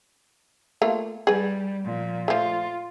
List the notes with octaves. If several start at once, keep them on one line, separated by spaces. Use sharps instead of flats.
A3 A#3 F4
G3 G#4 B4
A#2 F3
F3 A3 F4